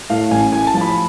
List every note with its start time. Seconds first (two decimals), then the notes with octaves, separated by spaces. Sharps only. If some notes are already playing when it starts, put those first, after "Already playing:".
0.10 A2 F5
0.31 A1 G#5
0.52 A2 G#5
0.67 A5
0.74 F3
0.81 B5